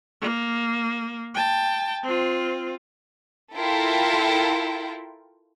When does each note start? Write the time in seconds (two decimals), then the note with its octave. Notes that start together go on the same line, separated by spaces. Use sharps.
0.21 A#3
1.34 G5 A5
2.03 C4 F4
3.56 E4 F4 A4 A#4 G5